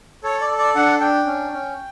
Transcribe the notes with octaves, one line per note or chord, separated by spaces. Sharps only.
A4 C#5
D5
A4
D5
D4 F#5
D4 G5
C#4
C#4